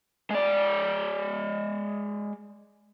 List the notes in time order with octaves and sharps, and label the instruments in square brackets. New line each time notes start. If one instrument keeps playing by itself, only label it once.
[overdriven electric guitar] G#3 D5